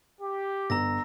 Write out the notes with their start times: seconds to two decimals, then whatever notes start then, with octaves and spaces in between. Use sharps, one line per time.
0.20 G4
0.70 G1 A#5 E6 A#6